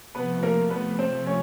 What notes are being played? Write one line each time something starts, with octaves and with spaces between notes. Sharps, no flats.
C3 F3 A3 B3 B4
A#3 A#4
B3 B4
C4 C5
C#4 C#5